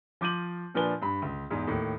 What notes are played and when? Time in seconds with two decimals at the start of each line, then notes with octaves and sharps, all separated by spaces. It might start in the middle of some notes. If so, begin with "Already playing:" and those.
0.21 F3 D6 G6 D#7 F#7
0.75 A#2 F3 D4 B4 G#5 G7
1.02 G2 B5
1.22 C#2
1.50 E2 G#2
1.67 D#2 A2